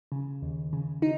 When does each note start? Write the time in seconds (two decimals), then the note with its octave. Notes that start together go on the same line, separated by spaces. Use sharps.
0.12 C#3
0.42 D#2
0.73 C#3
1.02 D#4